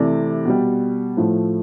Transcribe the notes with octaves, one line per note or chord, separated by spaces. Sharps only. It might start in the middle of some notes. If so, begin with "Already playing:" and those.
Already playing: C3 E3 A3 D5
B2 G3
A2 F3 A3